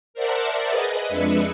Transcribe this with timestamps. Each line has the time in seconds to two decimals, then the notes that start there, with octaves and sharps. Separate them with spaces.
0.14 A#4 C5 D5 E5 F#5 A5
0.69 G#4 B4 D#5
1.09 F2 G#3 D4 B4 E5 C#7